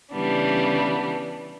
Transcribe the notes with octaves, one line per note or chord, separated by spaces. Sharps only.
C#3 E3 G3 B3 D4